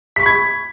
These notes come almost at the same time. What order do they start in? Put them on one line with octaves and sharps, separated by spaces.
B6 C#6 B5 G#6